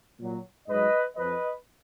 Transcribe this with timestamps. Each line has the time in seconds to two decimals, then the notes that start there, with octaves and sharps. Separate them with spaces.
0.19 A#2 F#3
0.68 G#2 F#3 B4 D#5
1.16 F2 F3 B4 D#5